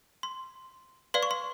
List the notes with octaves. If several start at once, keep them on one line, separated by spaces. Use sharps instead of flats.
C6
B4 D5 F5 C6
C#6
C6